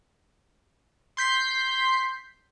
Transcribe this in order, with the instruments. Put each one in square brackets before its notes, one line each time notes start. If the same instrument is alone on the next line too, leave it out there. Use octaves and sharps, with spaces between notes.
[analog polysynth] C6 G6 B6 C7